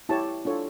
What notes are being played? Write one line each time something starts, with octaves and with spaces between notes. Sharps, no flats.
E4 G4 C#5 A5
D4 F4 A4 C#5